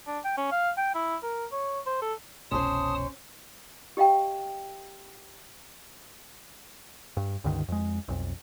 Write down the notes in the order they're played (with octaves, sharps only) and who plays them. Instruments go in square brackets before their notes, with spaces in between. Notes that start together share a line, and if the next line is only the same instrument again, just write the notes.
[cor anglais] D4
G5
C#4
F5
G5
E4
A#4
C#5
C5
A4
[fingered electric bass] F1 C2 B2 [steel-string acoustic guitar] C#4 C5 [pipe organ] A5 D#6 [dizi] C6
[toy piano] G4 D#5 F5 G5
[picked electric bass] G2
C#2 G2 D3 D#3
F2 G#3
B1 F2